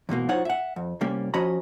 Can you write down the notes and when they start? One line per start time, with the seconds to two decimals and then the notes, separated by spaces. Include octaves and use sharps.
0.09 E2 G#2 B2 A#3
0.29 F#3 D#4 F4 C5 C#5 F#5
0.45 E5 F#5
0.76 F2
1.01 C2 G3 A#3 C#4
1.34 F3 C#4 F#4 D#5 A#5 B5